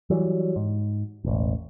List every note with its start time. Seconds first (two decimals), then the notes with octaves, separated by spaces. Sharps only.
0.10 E3 F#3 G3
0.56 G#2
1.24 E1 A1